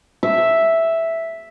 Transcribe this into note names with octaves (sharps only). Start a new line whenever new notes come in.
E5